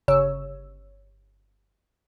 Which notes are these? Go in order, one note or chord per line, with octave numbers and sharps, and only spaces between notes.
G1 C#3 C#5 E6